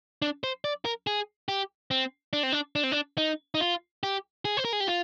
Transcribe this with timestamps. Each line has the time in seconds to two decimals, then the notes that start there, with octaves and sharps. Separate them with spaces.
0.22 D4
0.44 C5
0.64 D5
0.85 A#4
1.07 G#4
1.49 G4
1.91 C4
2.33 D4
2.43 C4
2.52 D4
2.76 D4
2.83 C4
2.92 D4
3.18 D#4
3.55 D#4
3.60 F4
4.03 G4
4.45 G#4
4.57 C5
4.65 A#4
4.73 G#4
4.80 G4
4.87 F4